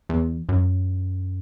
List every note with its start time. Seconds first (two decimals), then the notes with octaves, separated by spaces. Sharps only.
0.09 E2
0.49 F#2